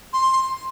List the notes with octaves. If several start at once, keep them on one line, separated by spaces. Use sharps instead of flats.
C6